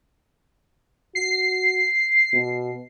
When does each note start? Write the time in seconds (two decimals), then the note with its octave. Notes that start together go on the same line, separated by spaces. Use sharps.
1.15 F#4 C7
2.34 B2